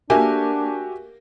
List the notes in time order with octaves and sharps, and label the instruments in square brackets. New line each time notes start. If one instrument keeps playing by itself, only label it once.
[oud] A#3 [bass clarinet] D4 [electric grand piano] F#4 G4 [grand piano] E5 G#5